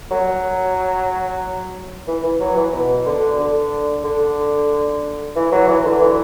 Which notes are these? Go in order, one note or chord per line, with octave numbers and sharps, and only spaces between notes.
F#3
E3
E3
F#3
E3
B2
D3
D3
D3
E3
F#3
E3
D3
E3